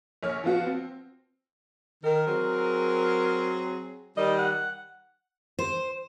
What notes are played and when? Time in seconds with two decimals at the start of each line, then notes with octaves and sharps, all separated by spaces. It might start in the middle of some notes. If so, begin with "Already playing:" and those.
0.23 A#1 C#5 F6
0.44 F3 B3 F4 F#4
0.66 C4
2.04 D#3 A#4
2.27 F#3 C4 G#4
4.17 D#3 G3 D#5
4.39 F#5
5.59 C5